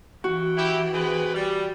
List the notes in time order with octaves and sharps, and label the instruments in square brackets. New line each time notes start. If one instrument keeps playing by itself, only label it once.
[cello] E3 G5 [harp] F#4
[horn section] E4 G4
C3 G#4 B4
G3